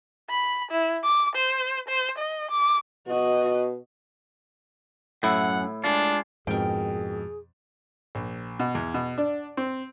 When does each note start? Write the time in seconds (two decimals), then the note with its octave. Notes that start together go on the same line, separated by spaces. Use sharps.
0.30 B5
0.71 E4
1.04 D6
1.36 C5
1.88 C5
2.18 D#5
2.51 D6
3.07 B2 F#4 D#5
5.23 F#2 A2 E4 F#5
5.84 G#3 D4 F4
6.47 F2 G#2 B2 G#4 A#4 G5
8.15 A#1
8.60 B2
8.75 E2
8.94 B2
9.18 D4
9.57 C4